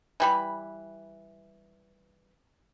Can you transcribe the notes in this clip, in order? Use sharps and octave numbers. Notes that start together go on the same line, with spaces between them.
E3 G3 B5